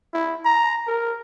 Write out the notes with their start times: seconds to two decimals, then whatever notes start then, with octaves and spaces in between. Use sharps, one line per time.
0.13 E4
0.45 A#5
0.87 A#4